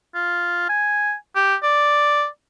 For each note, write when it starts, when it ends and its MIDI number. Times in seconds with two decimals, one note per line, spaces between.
0.15 0.67 65
0.69 1.14 80
1.35 1.55 67
1.63 2.26 74